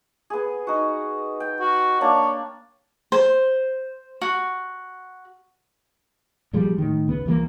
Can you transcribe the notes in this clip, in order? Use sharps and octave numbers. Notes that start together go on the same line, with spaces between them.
B3 G#4
D#4 F#4
G5
F#4
A#3 D4 C#5
C5
F#4
A#2 F3 G3 G#3
A2 D#3
C#2 B3
C2 E3 F#3 A#3